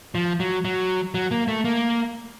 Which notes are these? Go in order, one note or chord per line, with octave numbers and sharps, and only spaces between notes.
F3
F#3
F#3
F#3
A#3
A3
A#3